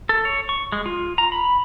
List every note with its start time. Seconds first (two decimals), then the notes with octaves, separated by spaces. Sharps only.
0.09 A4
0.25 C#5
0.49 C#6
0.72 G#3
0.86 F4
1.18 A#5
1.32 B5